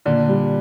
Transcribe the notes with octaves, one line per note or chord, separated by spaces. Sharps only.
A#2 D3 D4
G3